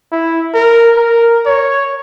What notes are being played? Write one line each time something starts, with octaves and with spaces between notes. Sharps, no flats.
E4
A#4
A#4
C#5